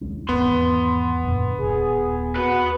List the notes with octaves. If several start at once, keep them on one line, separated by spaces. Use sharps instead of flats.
D#2 G#3 C#4
G#1 E2 B3 C6
F#2 A#2 D3
D#1 G#1 G#4
F#4 B4 F#5